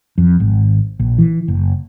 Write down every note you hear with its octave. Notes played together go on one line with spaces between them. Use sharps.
F2
G#1
A#1
E3
F#1